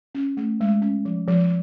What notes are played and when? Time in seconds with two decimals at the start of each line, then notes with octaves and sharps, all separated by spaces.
0.15 C#4
0.37 A3
0.60 G#3
0.82 C#4
1.05 F3
1.28 F3